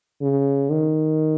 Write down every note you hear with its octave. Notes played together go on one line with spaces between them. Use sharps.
C#3
D#3